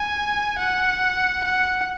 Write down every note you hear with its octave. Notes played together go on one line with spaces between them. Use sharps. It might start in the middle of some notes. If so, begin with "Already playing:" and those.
Already playing: G#5
F#5
F#5